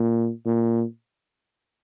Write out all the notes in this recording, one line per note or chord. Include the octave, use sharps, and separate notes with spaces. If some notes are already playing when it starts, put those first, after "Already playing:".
Already playing: A#2
A#2